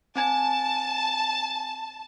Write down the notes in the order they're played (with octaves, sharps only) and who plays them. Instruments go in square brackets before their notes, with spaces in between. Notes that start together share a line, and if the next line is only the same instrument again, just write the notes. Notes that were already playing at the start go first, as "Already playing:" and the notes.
[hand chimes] C4 G#5 G#6 [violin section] A5